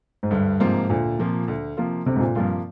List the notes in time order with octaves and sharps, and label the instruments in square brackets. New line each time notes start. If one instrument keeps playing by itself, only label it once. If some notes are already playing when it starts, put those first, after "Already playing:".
[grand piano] G#2
[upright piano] D2 [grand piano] G2
[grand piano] G#2 [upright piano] C3 F3 A#3 F4
[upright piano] D2 [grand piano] A#2
[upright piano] C3 F3 A#3 F4
D2
C3 F3 A#3 F4
[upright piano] D2 [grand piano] C3
[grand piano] G#2
A#2
[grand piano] G2 [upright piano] C3 F3 A#3 F4